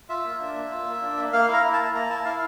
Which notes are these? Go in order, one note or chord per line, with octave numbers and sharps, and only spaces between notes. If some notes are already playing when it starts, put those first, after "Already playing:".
F4 E5
A#3
D4
A#3
F4
A#3
D4
A#3
A#3 F5
E4
A#5
E4
A5
A#3
A#3 A#5
E4 A5
E4 F5